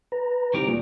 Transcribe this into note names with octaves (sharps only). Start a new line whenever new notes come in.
B4 A#5
C2 D#3 G4 A#4
D2 A#2